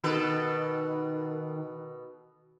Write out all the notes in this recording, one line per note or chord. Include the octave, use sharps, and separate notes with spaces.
B2 D#3 A4 B4